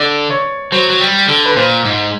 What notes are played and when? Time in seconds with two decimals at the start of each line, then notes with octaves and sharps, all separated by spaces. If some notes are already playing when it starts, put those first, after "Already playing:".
Already playing: D3 D5
0.30 C#5
0.72 F#3 C5
0.90 F#3
1.00 G3
1.28 D3
1.46 B4
1.56 A#2 C5
1.85 G#2